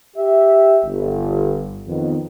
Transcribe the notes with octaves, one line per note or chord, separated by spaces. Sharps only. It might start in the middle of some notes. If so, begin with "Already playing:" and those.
G4 E5
G1
F2 D#3 B3